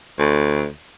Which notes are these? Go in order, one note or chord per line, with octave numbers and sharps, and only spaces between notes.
D2